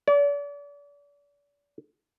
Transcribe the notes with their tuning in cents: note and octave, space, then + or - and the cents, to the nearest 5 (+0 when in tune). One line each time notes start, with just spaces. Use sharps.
D5 -40